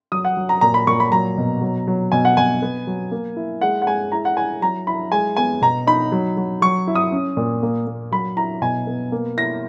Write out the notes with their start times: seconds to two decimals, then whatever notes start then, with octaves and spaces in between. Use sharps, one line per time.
0.12 F#3 D#6
0.25 F#5
0.37 F#3
0.49 A#5
0.61 A#2 A#5
0.74 B5
0.87 A#2 C#6
1.00 B5
1.12 F#3 A#5
1.38 B2
1.61 F#3
1.87 F#3
2.12 B2 G#5
2.25 F#5
2.37 B2 G#5
2.62 B3
2.87 F#3
3.11 A#3
3.36 E4
3.61 G#3 F#5
3.82 F#5
3.87 G#3 G#5
4.12 E4 A#5
4.25 F#5
4.37 E4 G#5
4.61 F#3 A#5
4.87 E4 B5
5.12 G#3 G#5
5.37 B3 G#5
5.61 B2 A#5
5.87 D#4 B5
6.12 F#3
6.37 F#3
6.62 F#3 C#6
6.87 E4
6.95 D#6
7.12 C#4
7.37 A#2
7.63 A#3
7.87 A#3
8.12 F#3 B5
8.37 E4 A#5
8.62 B2 G#5
8.87 B3
9.12 A#3
9.37 E4 A#6